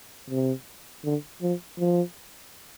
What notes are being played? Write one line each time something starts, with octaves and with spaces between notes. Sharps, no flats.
C3
D3
F3
F3